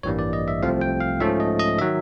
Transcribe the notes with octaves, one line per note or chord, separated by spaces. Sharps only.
A1 G2 E3 G3 A#3 C#5
D5
D#5
E5
C2 C3 F3 A3 C4 F5
G5
F5
G#2 F3 A3 C#4 E5
D#5
D#5
D#3 F#3 E5